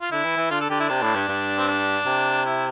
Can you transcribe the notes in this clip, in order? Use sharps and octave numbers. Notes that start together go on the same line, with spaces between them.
F4
D3 E4
E3
E3
D3 F4
A4
D3 G4
E4
C3 D4
A2
G2
G2
C4
D4
C3
E4